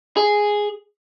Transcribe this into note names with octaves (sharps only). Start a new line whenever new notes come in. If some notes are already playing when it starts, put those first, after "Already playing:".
G#4